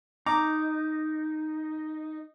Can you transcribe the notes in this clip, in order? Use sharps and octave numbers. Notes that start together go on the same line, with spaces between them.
D#4 A#5 D6